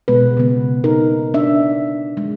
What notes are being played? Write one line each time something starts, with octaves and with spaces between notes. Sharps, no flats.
B2 G#3 B3 B4
C#3 B3
D#4 A#4
D4 E5
G#3